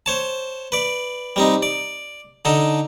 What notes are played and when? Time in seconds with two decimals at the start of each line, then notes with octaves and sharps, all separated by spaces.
0.06 C5 C#5 A5
0.72 B4 D5
1.36 G3 C4 D#4
1.63 D5
2.45 D3 D#4 A4